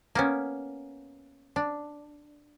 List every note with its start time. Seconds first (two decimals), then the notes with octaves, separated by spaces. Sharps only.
0.15 A#3 B3 C#4
1.56 D4